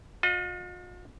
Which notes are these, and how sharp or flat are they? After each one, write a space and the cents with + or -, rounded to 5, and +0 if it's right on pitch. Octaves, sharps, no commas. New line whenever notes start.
F4 +45 D#5 +0